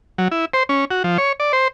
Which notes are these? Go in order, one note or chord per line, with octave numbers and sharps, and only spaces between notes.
F#3
E4
C5
C#4
F#4
F3
C#5
D5
C5